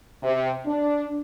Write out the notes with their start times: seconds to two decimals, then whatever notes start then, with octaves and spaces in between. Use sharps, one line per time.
0.23 C3
0.66 D4